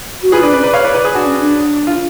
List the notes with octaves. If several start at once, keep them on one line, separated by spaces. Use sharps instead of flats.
F#4
F4 G#4 B4
D4 B4 D5
C#4 B4 D5
B4 D5
C#5 F5
B4 D5
B4 D5
G#4 B4
D4 F#4
C#4
D4
F4